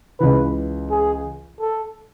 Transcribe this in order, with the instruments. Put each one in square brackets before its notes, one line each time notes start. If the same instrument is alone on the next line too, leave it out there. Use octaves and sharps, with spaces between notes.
[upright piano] C#2 C#3 E3 [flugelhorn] B4
[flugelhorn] G#4
A4